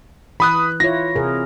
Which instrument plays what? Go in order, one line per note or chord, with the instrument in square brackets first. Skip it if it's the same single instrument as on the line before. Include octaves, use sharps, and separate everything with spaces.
[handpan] E3 [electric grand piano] B5 D#6 F#6
[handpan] E4 F4 C#5 [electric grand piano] A#6
[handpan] C3 G#4 A#4